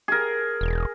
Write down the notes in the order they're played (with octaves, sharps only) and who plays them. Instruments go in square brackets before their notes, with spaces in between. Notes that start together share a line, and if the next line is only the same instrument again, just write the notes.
[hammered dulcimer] G#4 A#4
[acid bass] E1